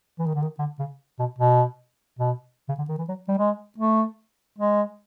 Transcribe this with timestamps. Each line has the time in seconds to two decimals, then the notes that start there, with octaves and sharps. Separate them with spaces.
0.19 E3
0.26 D#3
0.34 D3
0.42 D#3
0.59 D3
0.79 C#3
1.19 B2
1.39 B2
2.19 B2
2.68 C#3
2.78 D3
2.88 D#3
2.98 E3
3.08 F#3
3.28 G3
3.38 G#3
3.78 A3
4.58 G#3